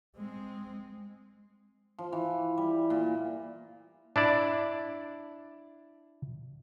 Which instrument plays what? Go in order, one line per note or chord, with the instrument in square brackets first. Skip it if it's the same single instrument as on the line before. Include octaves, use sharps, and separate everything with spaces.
[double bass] G#3 C4
[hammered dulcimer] F3
E3
G3
A#2
[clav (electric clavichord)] D4 E4 D5